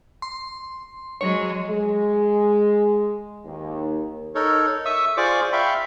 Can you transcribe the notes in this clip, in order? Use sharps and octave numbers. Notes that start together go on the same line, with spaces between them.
C6
F#3 G#3 C#5
G#3
D#2
D#4 A4 A#4 C#5
E5 C#6 D#6 E6
F4 G#4 C5 D5 C#6 D6
E5 F5 G5 B5 C#6